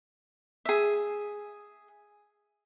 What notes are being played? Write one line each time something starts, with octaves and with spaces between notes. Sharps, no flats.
G#4 E5